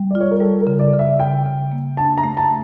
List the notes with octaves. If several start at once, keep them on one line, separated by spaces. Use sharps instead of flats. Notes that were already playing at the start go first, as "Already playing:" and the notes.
Already playing: G3
F4 D5
C#5
A#4
G3 A4
A#4
C#3
D5
C#3
E5
C#3 G5
C#3
A#3
D4 A5
A#5
A3
A5